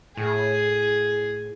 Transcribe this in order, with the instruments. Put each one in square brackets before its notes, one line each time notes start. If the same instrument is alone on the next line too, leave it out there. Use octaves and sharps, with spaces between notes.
[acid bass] A2 [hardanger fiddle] G#4